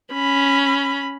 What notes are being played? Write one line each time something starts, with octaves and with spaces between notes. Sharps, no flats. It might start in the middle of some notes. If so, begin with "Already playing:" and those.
C#4 B5